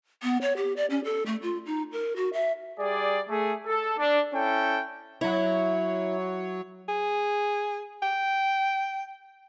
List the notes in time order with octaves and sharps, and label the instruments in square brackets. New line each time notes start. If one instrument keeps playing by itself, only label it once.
[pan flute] B3
C#5
G4
D5
C#4
A4
A3
F4
D#4
A#4
F#4
E5
[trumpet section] G3 G#4 D5
A3 G#4
A4
D4
C#4 E4 A4 G5
[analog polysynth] F#3 C#5 [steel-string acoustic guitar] E4
[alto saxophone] G#4
G5